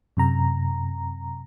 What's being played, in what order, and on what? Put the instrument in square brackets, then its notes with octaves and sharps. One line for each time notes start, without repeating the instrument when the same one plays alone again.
[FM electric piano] F#2 C3 A#5